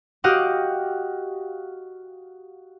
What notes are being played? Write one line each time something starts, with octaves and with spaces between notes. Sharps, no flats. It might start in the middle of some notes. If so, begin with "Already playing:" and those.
F#4 G4 D#5 F5 F#5 D6